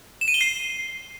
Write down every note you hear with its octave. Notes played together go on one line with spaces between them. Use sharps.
E7
D#7
G7
C7